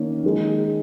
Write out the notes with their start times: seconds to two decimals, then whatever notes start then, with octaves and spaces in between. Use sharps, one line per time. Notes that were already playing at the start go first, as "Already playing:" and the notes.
Already playing: D#3 A#3 C#4
0.23 D#3 G#3 D#4